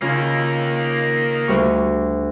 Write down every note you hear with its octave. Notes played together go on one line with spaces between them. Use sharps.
C#3 A#3 C#4 D#4 F4
D2 G3 C#6